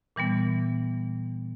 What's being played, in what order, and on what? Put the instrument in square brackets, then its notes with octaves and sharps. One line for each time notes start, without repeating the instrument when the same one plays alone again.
[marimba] A#2 E3 G3 B3